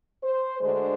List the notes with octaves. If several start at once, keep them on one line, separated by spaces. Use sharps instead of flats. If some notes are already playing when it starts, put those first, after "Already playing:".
C5
D2 D3 G#3 C5